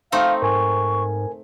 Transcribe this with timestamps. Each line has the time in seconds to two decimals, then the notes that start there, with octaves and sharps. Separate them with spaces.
0.12 A3 C4 D#4 F5
0.42 G#2 A#4 G#5 C#6